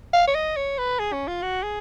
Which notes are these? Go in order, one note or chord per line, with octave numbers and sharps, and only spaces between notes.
F5
C#5
D#5
C#5
B4
G#4
C#4
F4
F#4
G#4